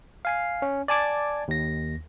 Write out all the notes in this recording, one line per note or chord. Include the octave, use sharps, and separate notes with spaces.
F5 G#5 C7
C#4
D5 G#5 A5 D6 G#6
D#2 A#6